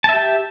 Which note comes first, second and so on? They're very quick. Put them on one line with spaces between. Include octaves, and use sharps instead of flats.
A5 E5 G4